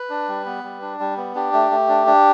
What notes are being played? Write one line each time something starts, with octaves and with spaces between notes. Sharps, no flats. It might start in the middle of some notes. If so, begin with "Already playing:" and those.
Already playing: B4
D4
G3
B3
G3
D4
G3
B3
D4 G4
A3
A3
D4
D4